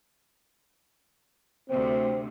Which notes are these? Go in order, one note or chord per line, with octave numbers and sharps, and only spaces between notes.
D2 C3 C4